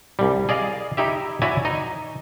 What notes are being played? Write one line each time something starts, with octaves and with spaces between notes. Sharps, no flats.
C2 G3
G#4 D5 D#5 F5
D#4 E4 G4 E5
E4 F#4 C#5 D5 G#5
D#4 D#5